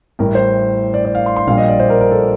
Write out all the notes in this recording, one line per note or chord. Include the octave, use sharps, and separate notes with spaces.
A1 A2 G3 A#4
C5
D5
D5
F5
C6
C6
A#1 A#2 G3 F5
D#5
D5
C5
A#4
A#4
A4